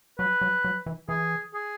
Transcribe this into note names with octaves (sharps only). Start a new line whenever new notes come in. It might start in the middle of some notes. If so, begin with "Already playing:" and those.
F#3 B4
F#3
F#3
E3
E3 G#4
G#4